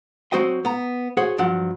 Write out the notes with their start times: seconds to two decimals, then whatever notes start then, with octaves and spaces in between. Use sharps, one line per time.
0.32 F#3 C4 F#4 C5 D#5 G5
0.65 B3 A#5
1.17 F#4 G#4 C5 C#5 F#5
1.38 G2 F3 F#3 F#5